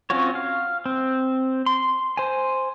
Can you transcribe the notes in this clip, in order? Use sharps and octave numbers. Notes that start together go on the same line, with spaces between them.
C4 C#4 F4 F#4 C#5
F5
C4
C6
C5 G#5